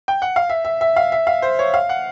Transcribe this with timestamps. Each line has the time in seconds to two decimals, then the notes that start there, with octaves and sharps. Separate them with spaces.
0.08 G5
0.22 F#5
0.36 F5
0.50 E5
0.65 E5
0.81 E5
0.96 F5
1.12 E5
1.27 F5
1.42 C5
1.59 C#5
1.74 F5
1.89 F#5